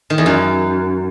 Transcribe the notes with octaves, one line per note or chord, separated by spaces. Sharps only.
D#3
E2
F#2